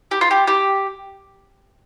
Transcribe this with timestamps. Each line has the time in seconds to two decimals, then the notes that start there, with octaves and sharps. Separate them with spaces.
0.11 G4
0.21 F4
0.31 G4
0.47 G4